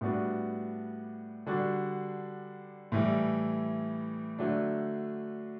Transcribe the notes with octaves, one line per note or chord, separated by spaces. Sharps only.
A2 G3 B3 D4 F#4
D3 G3 D4 F#4
A2 E3 G3
D3 F#3 A3 D4